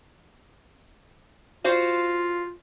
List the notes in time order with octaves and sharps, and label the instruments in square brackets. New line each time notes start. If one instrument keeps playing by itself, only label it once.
[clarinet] F4 [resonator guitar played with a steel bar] F#4 C5 F5